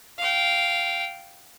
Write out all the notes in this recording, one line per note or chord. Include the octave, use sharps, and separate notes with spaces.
F5 G5